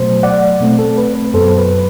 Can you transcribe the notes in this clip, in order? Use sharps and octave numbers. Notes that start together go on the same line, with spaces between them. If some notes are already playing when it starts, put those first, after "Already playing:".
Already playing: B2 F#3 A3 C5
D5 F#5
B2 A3 C4
A4
B4
B4
F#2 F#3 B3 A4 C5
B4